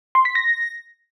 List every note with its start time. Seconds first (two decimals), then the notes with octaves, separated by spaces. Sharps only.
0.15 C6
0.25 B6
0.35 A#6